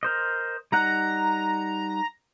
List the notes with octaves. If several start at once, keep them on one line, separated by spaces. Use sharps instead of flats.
A#4 C5 D#5
G3 D#4 F#5 A#5